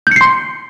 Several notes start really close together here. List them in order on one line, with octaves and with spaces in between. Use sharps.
G6 C#7 C7 C6